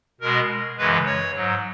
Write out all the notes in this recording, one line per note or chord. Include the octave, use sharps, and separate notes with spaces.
B2 G#3 A#4
F#2 C#3 E3 G#3 B4
C#5
G#2 F#3